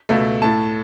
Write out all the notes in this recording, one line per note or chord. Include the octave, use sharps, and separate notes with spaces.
C#2 B2 A3
A2 A3 A5